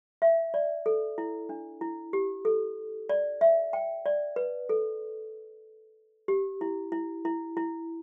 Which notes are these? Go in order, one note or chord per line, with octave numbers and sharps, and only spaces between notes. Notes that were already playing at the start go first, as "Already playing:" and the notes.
E5
D5
A4
E4
D4
E4
G4
A4
D5
E5
G5
D5
B4
A4
G4
E4
E4
E4
E4